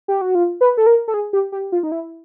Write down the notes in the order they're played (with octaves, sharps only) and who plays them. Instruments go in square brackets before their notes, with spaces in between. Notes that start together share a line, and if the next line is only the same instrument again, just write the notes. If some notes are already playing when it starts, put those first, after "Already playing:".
[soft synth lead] G4
F#4
F4
B4
A4
A#4
A4
G#4
G4
G4
F4
D#4
E4